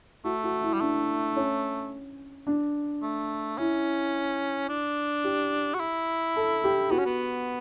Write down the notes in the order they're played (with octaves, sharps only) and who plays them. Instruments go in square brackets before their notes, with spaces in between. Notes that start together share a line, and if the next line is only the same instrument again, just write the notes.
[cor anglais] A3 [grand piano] F#4
[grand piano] F#4
E4
[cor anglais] G3
[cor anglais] A3 [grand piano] D4
[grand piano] C#4
D4
[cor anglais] A3
[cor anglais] C#4 [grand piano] E4
[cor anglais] D4
[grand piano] G4
[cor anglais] F#4
E4
[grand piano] A4
G4
[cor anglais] B3 [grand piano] F#4
[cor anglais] C#4
B3